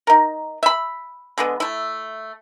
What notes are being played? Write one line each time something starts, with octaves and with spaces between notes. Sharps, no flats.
D#4 A#4
E5 B5
D3 G#3 B3
A3 E4